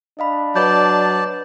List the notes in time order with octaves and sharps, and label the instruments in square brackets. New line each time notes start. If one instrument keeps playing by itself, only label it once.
[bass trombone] D4 [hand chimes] D#5 F5 B5
[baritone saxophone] F#3 [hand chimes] B4 D#5 G6 [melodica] D5 A5